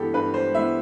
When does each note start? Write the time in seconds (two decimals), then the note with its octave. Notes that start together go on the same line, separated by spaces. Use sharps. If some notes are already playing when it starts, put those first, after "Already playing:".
Already playing: G2 E3 B3 G4 A4
0.13 G2 B4
0.34 C5
0.54 E3 B3 E5